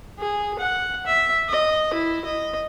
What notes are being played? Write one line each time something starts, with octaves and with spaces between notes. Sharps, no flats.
G#4
F#5
E5
D#5
E4
D#5